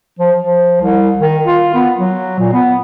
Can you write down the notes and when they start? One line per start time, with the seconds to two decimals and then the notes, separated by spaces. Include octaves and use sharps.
0.19 F3
0.38 F3
0.81 C2
1.19 D#3
1.45 F4
1.74 B3
1.96 F#3
2.39 A#2
2.53 B3